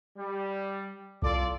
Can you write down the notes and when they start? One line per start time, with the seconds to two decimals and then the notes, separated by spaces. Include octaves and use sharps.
0.17 G3
1.22 C2 F4 A4 D5